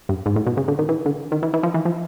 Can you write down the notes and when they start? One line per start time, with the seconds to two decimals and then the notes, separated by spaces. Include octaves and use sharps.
0.09 G2
0.26 G#2
0.36 A2
0.46 B2
0.57 C#3
0.68 D3
0.79 D#3
0.89 E3
1.06 D3
1.32 D#3
1.43 E3
1.54 E3
1.63 F3
1.74 E3
1.85 F3